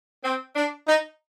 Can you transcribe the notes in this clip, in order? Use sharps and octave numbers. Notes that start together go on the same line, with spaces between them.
C4
D4
D#4